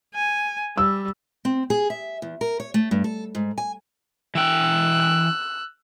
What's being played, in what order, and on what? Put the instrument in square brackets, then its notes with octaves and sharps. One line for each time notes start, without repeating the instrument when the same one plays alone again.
[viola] G#5
[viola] G3 [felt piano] E6
[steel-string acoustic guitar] C4
G#4
E5
E2
A#4
C#5
A3
G2
A4
G#2
G#5
[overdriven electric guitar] E3 G5 [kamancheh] E6 F#6